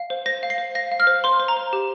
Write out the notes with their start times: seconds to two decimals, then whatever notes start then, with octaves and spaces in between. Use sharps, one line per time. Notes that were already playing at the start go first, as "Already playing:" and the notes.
Already playing: F5
0.10 C5
0.26 C5 A#6
0.43 F5
0.50 C7
0.58 C5
0.75 F5 A#6
0.92 F5
1.00 F6
1.07 C5
1.24 C5 C6
1.40 C5
1.48 A#5
1.57 C5
1.73 G4